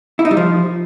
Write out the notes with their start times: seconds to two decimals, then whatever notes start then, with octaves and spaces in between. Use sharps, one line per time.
0.19 E4
0.25 D#4
0.31 G3
0.37 F3